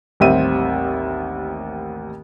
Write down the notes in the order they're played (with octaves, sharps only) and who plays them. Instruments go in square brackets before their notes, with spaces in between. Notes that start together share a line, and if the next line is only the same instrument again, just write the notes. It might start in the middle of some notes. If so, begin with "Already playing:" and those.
[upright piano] A1 D#2 G3 C4 E5 D#7